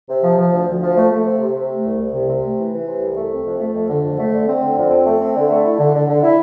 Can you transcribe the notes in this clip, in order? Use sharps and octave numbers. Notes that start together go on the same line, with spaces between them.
C3
F3
F3
D2
D2
F3
A3
A3
C3
C3
C3
A3
C2
C2
C3
C3
A3
E3
E3
C3
C2
A3
C4
F2
A3
F2
D3
F2
A3
D3
C4
D3
F2
C4
A3
C4
D3
A3
E4
D3
D3
D3
E4